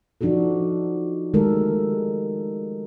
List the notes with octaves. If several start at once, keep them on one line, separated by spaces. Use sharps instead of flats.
F3 D4 D#4 F#4 A4
D#3 G#3 A3 G4 A4 A#4